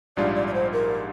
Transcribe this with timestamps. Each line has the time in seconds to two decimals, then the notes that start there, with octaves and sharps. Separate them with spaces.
0.17 A#1 G#2 G3 D4 F4 D5
0.35 D5
0.47 D5
0.54 C5
0.73 A#4